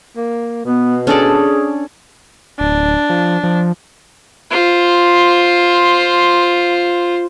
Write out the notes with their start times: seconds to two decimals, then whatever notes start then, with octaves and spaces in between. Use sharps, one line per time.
0.17 A#3
0.65 B2 B3
1.07 C#4 D4 G#4 A4 D5
2.59 D1 D4
3.10 F3
3.44 F3
4.51 F4 C5